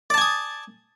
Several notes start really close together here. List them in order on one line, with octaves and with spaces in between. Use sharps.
D5 A5 G#5 D#6